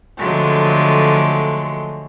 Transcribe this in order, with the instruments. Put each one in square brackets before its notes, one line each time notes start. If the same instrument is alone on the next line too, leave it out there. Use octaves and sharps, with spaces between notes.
[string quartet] D3 F3 F#3 G#3 A3